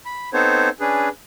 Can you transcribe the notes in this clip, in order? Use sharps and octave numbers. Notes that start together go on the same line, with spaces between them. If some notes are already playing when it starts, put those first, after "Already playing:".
B5
B3 C4 D#4 A4 C5 C#5
C#4 D4 G#4 B4